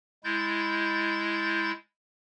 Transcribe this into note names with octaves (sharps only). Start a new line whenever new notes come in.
G#3 E4 G6 A6